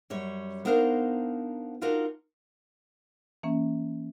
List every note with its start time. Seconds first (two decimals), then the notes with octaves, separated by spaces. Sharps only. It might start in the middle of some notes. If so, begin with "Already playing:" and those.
0.10 F#2 G3 C#5
0.65 B3 D4 D#4 A#4 C5 F5
1.81 D4 D#4 F4 F#4 A#4
3.43 E3 A#3 C#4